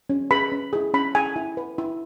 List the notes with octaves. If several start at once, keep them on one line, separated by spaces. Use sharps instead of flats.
C#4
G#4 B4 B5
C#4
E4 G#4
C#4 B5
E4 G#4 G#5
E4
B4
E4